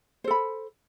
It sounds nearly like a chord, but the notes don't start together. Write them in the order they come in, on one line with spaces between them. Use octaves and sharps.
C5 A4 B5